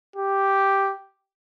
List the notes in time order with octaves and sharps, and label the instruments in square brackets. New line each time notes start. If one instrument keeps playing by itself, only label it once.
[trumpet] G4